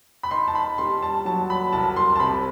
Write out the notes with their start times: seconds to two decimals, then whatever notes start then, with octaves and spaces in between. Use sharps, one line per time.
0.23 B5
0.31 D#4 C6
0.48 A5
0.55 B5
0.78 G3 C6
1.02 A5
1.25 F#3 A5
1.50 B5
1.73 C2 A5
1.96 C6
2.16 A5
2.20 C3 B5